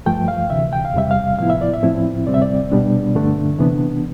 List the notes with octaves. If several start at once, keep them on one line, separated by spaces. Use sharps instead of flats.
G2 F3 A3 G5
F5
D2 C3 E3 E5
G5
F5
E2 C3 G3 E5
F5
A2 F3 B3 E4 F5
E5
D5
E5
A2 F3 C4 E4
D2 C3 G3 C4 D5
E5
D5
B2 G3 B3 D4
G2 D3 A3 D4
C3 E3 B3 D4